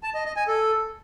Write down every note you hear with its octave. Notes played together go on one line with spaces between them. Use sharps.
A5
D#5
D#5
G#5
A4